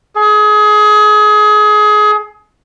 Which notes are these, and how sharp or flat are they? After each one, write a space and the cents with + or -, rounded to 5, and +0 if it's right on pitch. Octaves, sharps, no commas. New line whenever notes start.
G#4 +25